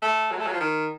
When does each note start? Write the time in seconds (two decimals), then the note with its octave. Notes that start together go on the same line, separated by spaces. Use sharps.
0.02 A3
0.32 F#3
0.39 A3
0.47 F#3
0.53 F3
0.60 D#3